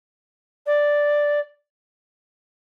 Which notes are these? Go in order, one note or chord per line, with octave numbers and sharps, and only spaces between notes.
D5